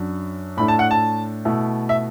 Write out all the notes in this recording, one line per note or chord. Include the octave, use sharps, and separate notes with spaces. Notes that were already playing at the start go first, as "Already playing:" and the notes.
Already playing: F#2 F#3 D4
A2 A3 D4 B5
A5
F#5
A5
B2 A3 E4
E5